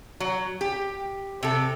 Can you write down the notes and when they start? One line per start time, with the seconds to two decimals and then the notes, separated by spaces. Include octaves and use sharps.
0.20 F#3
0.61 G4
1.43 C3 A4